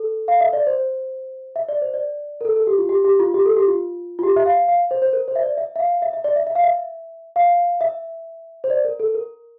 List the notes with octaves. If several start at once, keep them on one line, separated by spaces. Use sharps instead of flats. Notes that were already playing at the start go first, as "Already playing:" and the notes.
Already playing: A4
F5
E5
D5
C5
E5
D5
C5
D5
A#4
A4
A4
G4
F4
G4
G4
F4
G4
A4
G4
F4
F4
G4
E5
F5
F5
C5
C5
A#4
C5
E5
D5
E5
E5
F5
E5
E5
D5
E5
E5
F5
E5
F5
E5
C5
D5
A#4
A4
A#4